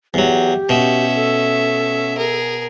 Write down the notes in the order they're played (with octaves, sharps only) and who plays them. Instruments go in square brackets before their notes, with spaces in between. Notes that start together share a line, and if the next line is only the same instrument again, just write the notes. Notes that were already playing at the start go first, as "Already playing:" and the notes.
[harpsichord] E2 F#3 [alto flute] G4
[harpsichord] B2 [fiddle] C#4 E5
[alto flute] A4
[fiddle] G#4 A#4